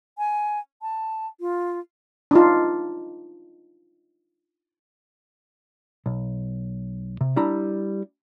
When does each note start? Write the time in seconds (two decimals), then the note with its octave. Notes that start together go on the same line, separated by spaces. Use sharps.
0.18 G#5
0.82 A5
1.40 F4
2.31 D4 D#4 F4
6.06 B1
7.21 C3
7.36 G3 D4 E4 A#5